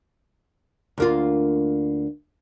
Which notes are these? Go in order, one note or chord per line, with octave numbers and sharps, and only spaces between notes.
D2 A#3 F4